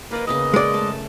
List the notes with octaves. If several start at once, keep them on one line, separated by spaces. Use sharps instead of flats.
A#3 B4 D5 D#5
C#3 A#3 B3 D#5
G#3 D5
A3 A5